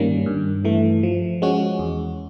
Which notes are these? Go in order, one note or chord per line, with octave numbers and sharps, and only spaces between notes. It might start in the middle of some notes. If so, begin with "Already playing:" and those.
Already playing: G2 D#3 G3 A#3 C#4
G2
E3 A3
F3
G#3 C#4 F#4
E2